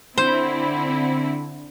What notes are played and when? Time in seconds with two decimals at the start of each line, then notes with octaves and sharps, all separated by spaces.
0.18 D3 C4 E4 C5